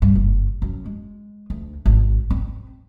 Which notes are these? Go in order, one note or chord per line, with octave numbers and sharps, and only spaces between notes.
G2
F#1
F#2
G#3
D2
G#1
C4